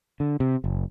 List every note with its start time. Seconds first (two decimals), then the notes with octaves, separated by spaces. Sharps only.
0.20 D3
0.40 C3
0.64 F#1